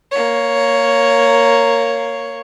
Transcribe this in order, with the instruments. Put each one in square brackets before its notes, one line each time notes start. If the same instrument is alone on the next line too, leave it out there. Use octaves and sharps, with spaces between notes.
[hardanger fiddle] A#3 C#5